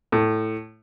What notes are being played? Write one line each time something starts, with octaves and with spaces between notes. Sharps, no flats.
A2